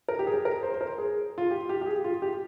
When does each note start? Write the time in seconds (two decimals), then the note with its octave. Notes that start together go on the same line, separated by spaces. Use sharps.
0.08 A#4
0.19 G4
0.27 G#4
0.45 A#4
0.63 C5
0.74 C5
0.81 A#4
0.98 G#4
1.38 F4
1.51 G4
1.69 G4
1.81 G4
1.86 G#4
2.04 F4
2.22 G4